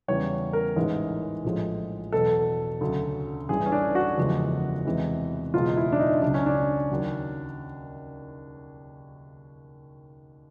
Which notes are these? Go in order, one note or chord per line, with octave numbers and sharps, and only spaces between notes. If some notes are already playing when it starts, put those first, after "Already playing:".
E2 C#3 E3 G3 C#5
A#4
A1 G#2 E3 G#3
A#1 A2 F3 G#3
E2 B2 F#3 A4
D2 C#3 F#3
A1 G2 E3 G#4
C#4
D4
F#4
F#1 E2 C#3 F3 G#3
E2 C3 E3 G#3
F#1 E2 B2 G#3 F4
E4
D4
D#4
C#2 C#3 F#3 D4
C#4
D4
D#2 C#3 F#3